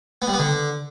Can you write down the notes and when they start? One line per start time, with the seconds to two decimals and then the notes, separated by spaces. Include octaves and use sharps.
0.22 B3
0.28 G3
0.33 B3
0.39 D3